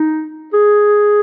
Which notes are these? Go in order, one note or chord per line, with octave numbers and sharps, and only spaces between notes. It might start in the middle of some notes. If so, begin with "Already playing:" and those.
Already playing: D#4
G#4